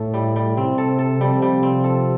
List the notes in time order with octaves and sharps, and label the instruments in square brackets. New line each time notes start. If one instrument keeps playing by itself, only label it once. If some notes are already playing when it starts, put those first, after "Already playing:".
Already playing: [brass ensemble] A2 [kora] A4
[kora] G3
G3
[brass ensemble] C3 [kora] C4
[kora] A4
A4
[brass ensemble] C3 F3 [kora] G3
[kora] G3
C4
A4